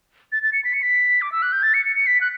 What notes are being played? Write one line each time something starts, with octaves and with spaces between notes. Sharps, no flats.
A6
A6
C#7
B6
C#7
B6
D6
E6
F#6
G6
A6
C#7
C#7
C#7
B6
F#6